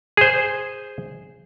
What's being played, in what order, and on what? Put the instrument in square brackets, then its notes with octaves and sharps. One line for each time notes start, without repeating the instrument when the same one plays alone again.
[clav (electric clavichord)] G#4 C5